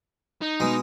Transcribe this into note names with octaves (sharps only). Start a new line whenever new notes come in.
D#4
B2 G#3